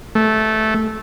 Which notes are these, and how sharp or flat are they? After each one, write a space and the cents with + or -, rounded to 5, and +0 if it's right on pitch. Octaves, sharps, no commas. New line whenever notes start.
A3 -10